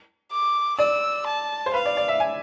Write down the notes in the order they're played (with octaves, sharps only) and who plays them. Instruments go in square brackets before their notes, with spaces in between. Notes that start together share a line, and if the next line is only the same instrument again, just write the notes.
[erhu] D6
[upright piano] D5 [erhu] E6
[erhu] A5
[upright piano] C5
[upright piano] B4 [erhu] F5
[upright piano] D5
D5
E5
G#5